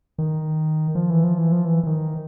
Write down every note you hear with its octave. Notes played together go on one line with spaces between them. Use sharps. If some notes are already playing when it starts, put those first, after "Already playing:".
D#3
F3
E3
F3
E3
F3
E3
E3
D#3